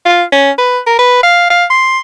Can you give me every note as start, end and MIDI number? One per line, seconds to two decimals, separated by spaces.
0.06 0.23 65
0.32 0.50 61
0.58 0.80 71
0.86 0.98 70
0.99 1.20 71
1.23 1.47 77
1.50 1.65 77
1.70 1.99 84